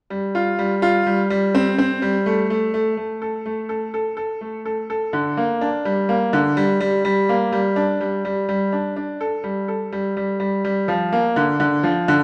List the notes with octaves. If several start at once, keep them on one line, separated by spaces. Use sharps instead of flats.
G3
F4
G3
F4
G3
G3
C4
C4
G3
A3
A3
A3
A3
A4
A3
A4
A4
A4
A3
A4
A4
D3
A#3
D4
G3
A#3
D3
G3
G3
G3
A#3
G3
D4
G3
G3
G3
D4
D4
A4
G3
A4
G3
G3
G3
G3
F3
A#3
D3
D3
F3
D3